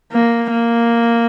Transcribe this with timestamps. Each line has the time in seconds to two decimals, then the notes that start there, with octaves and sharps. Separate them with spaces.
0.12 A#3
0.51 A#3